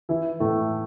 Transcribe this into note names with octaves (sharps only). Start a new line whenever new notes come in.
E3 E4
A2 A3